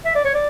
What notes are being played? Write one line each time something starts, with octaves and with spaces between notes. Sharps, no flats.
E5
D5
C#5
D5